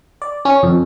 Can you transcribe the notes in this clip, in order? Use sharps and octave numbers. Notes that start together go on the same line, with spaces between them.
D5
C#4
F2